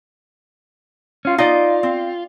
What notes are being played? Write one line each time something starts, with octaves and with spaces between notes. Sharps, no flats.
C#4 F4
D#4 F4 D5
C4